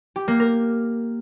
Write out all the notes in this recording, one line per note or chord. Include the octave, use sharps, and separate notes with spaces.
G4
A#3
A#4